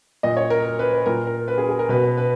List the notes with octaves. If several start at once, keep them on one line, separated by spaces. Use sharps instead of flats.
A#2 D#5
C#5
A#4
A#4
B4
B4
A#2 A#4
A#4
B4
G#4
G#4
A#4
B2 B4
B4
B4